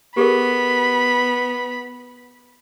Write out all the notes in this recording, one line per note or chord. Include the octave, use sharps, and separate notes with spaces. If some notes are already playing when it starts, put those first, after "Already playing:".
B3 G4 G#4 A#4 B5